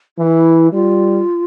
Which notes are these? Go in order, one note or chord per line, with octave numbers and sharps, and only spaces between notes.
E3 E4
G3 F4